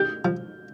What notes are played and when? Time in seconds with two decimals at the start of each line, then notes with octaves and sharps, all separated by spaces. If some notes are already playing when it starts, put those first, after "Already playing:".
Already playing: G4 G6
0.25 F3